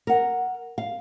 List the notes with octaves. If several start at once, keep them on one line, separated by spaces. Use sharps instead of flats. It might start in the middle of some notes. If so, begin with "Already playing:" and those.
A#4 F#5
F5